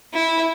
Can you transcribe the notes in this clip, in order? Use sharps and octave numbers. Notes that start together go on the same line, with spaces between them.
E4